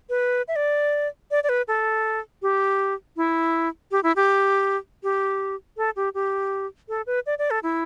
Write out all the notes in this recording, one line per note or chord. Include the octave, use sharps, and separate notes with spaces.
B4
E5
D5
D5
D5
B4
A4
G4
E4
G4
E4
G4
G4
A4
G4
G4
A4
B4
D5
D5
A4
E4